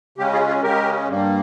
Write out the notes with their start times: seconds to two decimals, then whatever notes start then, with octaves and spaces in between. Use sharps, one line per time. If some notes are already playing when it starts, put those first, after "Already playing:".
0.18 C#3 G#3 C#4 G4
0.33 F4 G#4
0.48 F4 G#4
0.63 C#3 G#3 C#4 G4 A#4
1.08 G2 G3 A#3